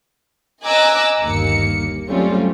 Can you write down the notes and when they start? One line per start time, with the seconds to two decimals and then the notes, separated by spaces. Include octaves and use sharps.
0.64 D#5 G#5 A#5 D6 E6 F#6
1.22 G1 D#2 A#3 C#7
2.08 F#3 G3 A3 C4 C#4 F4